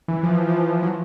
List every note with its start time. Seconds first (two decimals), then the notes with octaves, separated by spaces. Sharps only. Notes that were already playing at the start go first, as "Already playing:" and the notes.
0.08 E3
0.23 F3
0.35 E3
0.49 F3
0.83 F#3